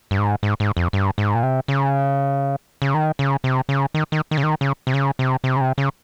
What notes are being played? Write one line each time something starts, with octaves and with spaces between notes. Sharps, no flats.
G2
G#2
G#2
G#2
F2
G2
G#2
A#2
C3
C#3
C#3
D#3
C#3
C3
C#3
D#3
D#3
D#3
C#3
D#3
C#3
C3
C#3
C3
C3
C#3
C3
C#3